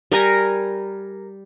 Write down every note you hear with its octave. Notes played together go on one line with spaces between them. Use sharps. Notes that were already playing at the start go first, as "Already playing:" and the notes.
G3 A#4 G#5 A#5